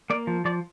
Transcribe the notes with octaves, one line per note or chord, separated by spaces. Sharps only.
A#3 D5
F3
F3 D5